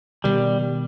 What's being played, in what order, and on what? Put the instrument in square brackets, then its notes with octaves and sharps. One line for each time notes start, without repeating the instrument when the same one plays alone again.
[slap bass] B2 D#3 [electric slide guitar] G3